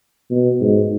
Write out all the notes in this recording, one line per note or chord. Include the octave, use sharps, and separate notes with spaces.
B2
G#2